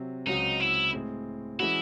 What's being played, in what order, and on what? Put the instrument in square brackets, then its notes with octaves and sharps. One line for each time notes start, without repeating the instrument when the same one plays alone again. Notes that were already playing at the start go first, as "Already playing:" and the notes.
Already playing: [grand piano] C3 F#3 C4
[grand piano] C#2 C#3 F#3 C4 F#4 [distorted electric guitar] D#4
[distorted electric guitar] E4
[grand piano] A2 G#3 C4
[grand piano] E3 G#3 C#4 F#4 [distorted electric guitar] E4